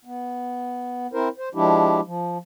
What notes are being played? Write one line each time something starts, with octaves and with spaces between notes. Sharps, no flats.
B3
C4 E4 A#4 C5
C5
F3 G#3 D4 E4 G4
F3